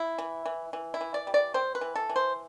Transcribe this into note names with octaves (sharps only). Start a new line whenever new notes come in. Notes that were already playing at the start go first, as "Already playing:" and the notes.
Already playing: E4
E3
E3
E3
E4
E3
D5
G3
D5
C4 C5
B4
E3
A4
E3
C5